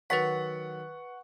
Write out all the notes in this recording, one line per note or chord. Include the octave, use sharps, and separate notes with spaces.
D#3 F#3 B4 F#5 C#6 A6 B6